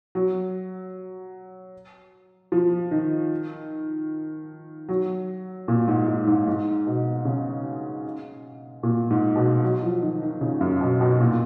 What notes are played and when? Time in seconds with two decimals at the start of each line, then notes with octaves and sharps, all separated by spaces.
0.15 F#3
2.52 F3
2.91 D#3
4.89 F#3
5.68 A#2
5.88 G#2
6.07 G#2
6.27 G#2
6.47 G#2
6.87 B2
7.25 C#3
8.83 A#2
9.10 G#2
9.36 B2
9.63 F#3
9.83 F3
10.02 D#3
10.22 D#3
10.41 C#3
10.61 F#2
10.81 B2
11.01 B2
11.20 A#2